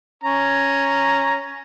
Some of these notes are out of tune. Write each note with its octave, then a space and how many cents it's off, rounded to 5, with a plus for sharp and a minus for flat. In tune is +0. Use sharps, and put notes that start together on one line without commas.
C#4 +0 A#5 +0